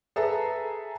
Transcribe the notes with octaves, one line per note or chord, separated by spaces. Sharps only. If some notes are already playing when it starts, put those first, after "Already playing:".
G#4 A4 B4 E5 A5 A#5